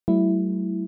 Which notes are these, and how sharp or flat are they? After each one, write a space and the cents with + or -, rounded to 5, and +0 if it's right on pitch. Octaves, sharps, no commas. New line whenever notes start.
F#3 +40 A3 +0 E4 +0